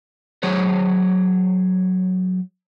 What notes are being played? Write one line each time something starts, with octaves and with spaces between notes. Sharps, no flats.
F#3 G#4 C5 C#5